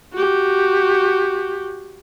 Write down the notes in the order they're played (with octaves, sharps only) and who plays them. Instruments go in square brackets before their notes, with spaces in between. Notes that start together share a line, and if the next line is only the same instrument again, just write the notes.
[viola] F#4 G4